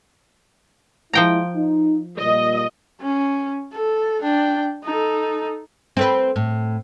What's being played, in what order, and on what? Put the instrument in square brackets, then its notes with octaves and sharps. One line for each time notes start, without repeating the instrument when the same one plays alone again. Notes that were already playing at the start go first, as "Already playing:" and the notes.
[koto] F3 G5 A#5 [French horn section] G#3 E4
[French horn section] D#4
[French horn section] A#2 G3 [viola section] D#5
[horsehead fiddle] C#4
A4
D4 G5
D#4 A4
[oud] C4 A4 B4
A2